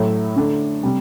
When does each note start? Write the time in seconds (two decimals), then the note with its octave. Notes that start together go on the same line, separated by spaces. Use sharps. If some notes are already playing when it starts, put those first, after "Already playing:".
Already playing: A2 F#3 A3 E4
0.36 D3 A3 D4
0.83 C3 G3